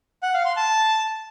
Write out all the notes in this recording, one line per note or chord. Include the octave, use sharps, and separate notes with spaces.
F#5
F5
C6
A5